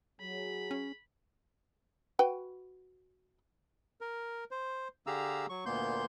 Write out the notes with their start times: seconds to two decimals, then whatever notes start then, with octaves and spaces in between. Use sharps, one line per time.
0.20 F#3 G#4 B5
0.71 C#4
2.19 F#4 B4 G5
4.01 A#4
4.51 C5
5.07 D3 G4 G#4 F5 A#5 E6
5.49 F#3 C#6
5.66 D2 A#2 A#3 B3 C6 G6